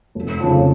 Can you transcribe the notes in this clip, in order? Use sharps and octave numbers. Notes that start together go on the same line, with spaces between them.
F1
F2 C#3